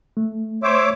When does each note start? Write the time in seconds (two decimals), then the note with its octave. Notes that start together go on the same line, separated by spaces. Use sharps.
0.17 A3
0.63 C5 C#5 E5 D6